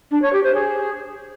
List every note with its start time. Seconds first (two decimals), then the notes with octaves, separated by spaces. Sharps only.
0.11 D4
0.21 C#5
0.32 G4
0.43 C5
0.54 G#4